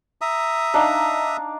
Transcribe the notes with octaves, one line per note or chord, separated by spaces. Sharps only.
E5 A#5 D#6
D4 D#4 F5